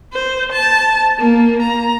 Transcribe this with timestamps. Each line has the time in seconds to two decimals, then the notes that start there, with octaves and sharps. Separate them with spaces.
0.13 C5
0.53 A5
1.18 A#3
1.62 A#5